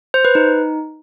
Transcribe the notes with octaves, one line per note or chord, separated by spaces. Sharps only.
C5
B4
D#4